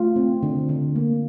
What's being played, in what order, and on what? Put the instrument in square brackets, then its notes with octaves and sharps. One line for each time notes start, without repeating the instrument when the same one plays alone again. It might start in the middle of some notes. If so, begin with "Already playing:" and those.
Already playing: [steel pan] A3 F4
C4
D3
D3
A#3